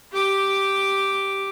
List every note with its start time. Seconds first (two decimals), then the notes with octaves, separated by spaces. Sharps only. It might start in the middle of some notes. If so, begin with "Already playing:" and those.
0.12 G4 D6